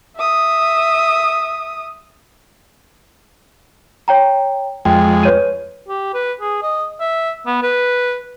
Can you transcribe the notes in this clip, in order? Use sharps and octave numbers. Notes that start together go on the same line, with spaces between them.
E5 D#6
C#5 G5 A#5
F2 G#3 G5
B4 C#5 D#7
G4
B4
G#4
D#5
E5
B3
B4